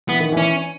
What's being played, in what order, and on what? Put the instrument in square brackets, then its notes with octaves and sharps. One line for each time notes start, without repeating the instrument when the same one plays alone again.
[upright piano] E3 [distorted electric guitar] B3
[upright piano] D#3
[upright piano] E3 [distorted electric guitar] C#4